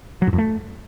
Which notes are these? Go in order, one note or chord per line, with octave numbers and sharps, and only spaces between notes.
F#3
G#2
F2
A3